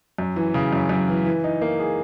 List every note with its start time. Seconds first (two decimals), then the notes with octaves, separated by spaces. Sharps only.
0.18 F#2
0.36 E3
0.54 C#3
0.73 F#2
0.89 F#2
1.08 E3
1.26 E3
1.44 D#4
1.61 A#3
1.80 G#4